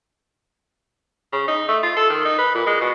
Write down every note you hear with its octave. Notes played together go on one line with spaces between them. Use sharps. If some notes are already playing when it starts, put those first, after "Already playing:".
C#3
D#4
A3
F4
A4
D#3
D#4
B4
A#2
G#3
B2